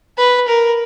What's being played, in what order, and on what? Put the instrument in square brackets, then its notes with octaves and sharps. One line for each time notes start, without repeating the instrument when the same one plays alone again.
[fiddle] B4
A#4